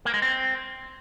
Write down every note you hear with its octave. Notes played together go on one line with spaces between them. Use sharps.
A#3
G#3
C4